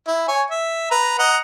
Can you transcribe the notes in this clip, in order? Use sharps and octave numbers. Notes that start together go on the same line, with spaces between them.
E4
C#5 G#5
E5
B4 A#5
D#5 F#5 A#5